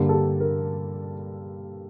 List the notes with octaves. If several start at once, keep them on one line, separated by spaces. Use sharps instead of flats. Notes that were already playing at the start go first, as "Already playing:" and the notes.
Already playing: G2 D3 G3 A#3
A4
G4
A#4